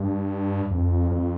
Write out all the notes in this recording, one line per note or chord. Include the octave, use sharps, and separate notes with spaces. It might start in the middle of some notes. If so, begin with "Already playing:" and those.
Already playing: G2
F2
F2